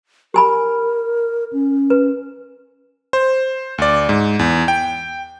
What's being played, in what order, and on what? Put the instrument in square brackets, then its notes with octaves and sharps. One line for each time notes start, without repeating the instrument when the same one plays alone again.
[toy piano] G4 G#5 B5 [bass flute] A#4
[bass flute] C#4
[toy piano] B4
[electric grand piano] C5
D2 D5
G#2
E2
G5